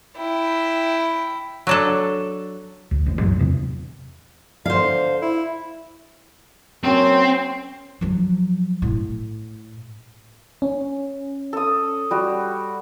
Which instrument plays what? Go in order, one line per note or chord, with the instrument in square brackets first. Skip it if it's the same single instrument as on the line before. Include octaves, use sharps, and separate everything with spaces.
[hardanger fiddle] E4 G5
[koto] F#3 D4 A4
[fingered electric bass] D2
D#1 A1
C#2 F#2 A2 F#3
E2 C3
[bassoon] D3 [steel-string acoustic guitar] C5 F5
[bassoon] E4
[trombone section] F#3 A#3 C#4 [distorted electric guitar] C4
[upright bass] F3 F#3
A2
[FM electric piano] C#4
[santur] A4 D#6
G3 F#4